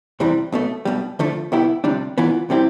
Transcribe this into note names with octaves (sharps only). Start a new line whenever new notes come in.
E2 C3 E3 G3 C4
B1 B2 A3
B1 B2 G3
D2 D3 F3 A3
C2 B2 B3 E4 G4
D2 C3 G3 D4
G2 E3 B3 F4
C3 G3 C4 E4 G4